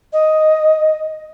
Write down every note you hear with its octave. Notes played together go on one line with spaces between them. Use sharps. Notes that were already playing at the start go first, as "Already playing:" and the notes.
D#5